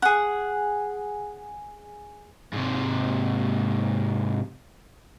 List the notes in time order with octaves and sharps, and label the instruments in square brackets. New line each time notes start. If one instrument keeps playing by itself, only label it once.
[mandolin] G#4 F#5
[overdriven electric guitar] G#2 C3